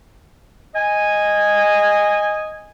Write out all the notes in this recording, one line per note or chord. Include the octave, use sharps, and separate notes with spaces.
D#5 G#5